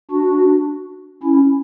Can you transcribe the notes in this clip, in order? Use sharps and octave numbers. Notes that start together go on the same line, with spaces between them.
D4 F#4
C#4 E4